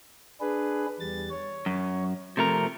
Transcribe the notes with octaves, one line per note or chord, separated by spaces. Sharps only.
D4 G#4 B4
E2 G3 A6
C#5
F#2
C3 F3 A3 C4 A#4